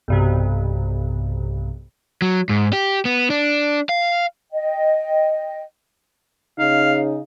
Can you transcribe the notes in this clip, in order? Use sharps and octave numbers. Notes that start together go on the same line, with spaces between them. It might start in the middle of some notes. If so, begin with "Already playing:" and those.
B1 G2 C3
F#3
G#2
G4
B3
D4
F5
D#5 G5
C#3 D#4 F5